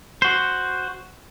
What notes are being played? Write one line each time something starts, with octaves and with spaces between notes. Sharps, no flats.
F#4 C5